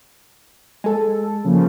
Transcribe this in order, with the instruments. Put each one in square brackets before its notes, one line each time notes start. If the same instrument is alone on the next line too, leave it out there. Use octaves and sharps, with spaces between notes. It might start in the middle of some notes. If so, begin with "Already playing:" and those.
[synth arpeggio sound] G#3 A4
[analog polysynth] C#3 F3 A#3